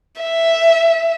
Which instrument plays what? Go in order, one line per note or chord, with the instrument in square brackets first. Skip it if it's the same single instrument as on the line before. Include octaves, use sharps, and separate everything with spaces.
[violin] E5